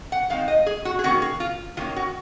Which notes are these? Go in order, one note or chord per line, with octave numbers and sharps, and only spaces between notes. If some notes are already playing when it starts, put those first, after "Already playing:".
F#5
D#3 G#3 C4 D#4 F5
D#5
G#4
F#4
G#4
D#3 A#3 C#4 F#4
G#4
F4
D#3 A#3 C#4 F4
F#4